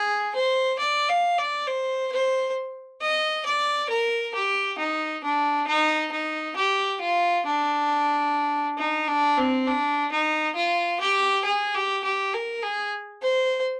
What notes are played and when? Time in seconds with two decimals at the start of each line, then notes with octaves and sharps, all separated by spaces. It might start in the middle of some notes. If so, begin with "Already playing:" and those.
Already playing: G#4
0.35 C5
0.79 D5
1.09 F5
1.38 D5
1.67 C5
2.12 C5
3.01 D#5
3.45 D5
3.89 A#4
4.34 G4
4.78 D#4
5.23 D4
5.67 D#4
6.11 D#4
6.56 G4
7.00 F4
7.45 D4
8.78 D#4
9.08 D4
9.37 C4
9.67 D4
10.11 D#4
10.55 F4
11.00 G4
11.44 G#4
11.74 G4
12.04 G4
12.33 A#4
12.62 G#4
13.22 C5